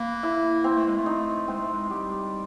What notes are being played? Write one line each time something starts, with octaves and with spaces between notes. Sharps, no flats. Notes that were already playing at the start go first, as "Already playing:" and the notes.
Already playing: A#3 B4
E4
A#3 C4
A3
G#3
A3
D#4
G#3 C4
A3
G#3
G3 G4